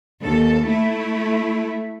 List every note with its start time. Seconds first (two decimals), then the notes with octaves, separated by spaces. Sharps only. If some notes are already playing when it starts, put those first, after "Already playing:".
0.22 D#2 A4
0.66 A3 E4